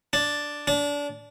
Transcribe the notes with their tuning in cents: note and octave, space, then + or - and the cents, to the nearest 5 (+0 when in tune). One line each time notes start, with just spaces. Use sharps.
D4 +0
D4 -25